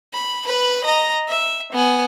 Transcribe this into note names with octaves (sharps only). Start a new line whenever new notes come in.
B5
B4 B5
D#5 A#5
E5
B3 G#5